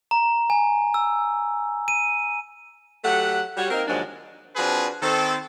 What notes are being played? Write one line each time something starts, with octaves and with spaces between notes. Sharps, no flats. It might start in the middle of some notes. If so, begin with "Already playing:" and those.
A#5
G#5
E6
D#7
F#3 A3 G4 F#5
G3 F#4 C#5
A#3 C4 D#4 A#4
D#2 G#2 F3 F#3 G#3 D4
F3 C4 D4 F#4 G#4 B4
D#3 C4 A4